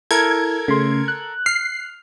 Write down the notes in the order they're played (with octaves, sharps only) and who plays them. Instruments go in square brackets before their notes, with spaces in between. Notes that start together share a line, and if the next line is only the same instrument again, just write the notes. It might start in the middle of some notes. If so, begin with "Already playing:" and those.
[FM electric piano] E4 [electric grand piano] A4 A#4 [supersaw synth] G#6
[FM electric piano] C#3 A3 C6
F#6
[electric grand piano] F6 [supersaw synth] C7